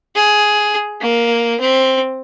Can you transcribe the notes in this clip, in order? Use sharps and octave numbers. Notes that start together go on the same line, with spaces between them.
G#4
A#3
C4